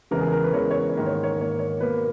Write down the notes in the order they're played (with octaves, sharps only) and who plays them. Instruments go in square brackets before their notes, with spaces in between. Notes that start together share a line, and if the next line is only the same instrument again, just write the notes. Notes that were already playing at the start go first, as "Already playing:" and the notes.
[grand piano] E2 C#3 E3 G#3 A#4
G#4
A#4
B4
E2 C#3 E3 G#3 C#5
C#5
C#5
G#2 D#3 A#3
C#5
C#5
G#2 D#3 A#3 C#5
C#5
B2 A#3 B4